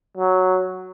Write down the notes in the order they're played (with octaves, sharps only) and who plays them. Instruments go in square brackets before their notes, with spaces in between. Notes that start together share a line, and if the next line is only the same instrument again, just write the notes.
[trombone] F#3